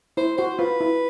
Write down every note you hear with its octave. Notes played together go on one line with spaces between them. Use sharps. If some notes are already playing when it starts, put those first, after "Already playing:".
E4 C5
F#4 C5
F4 B4
E4